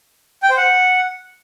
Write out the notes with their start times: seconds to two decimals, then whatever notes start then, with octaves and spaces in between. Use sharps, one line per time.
0.43 G5
0.50 C5
0.57 F#5